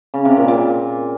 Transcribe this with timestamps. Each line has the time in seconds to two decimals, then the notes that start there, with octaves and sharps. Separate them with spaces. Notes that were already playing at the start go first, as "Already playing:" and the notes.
0.14 C#3
0.25 C3
0.37 A#2
0.48 A#2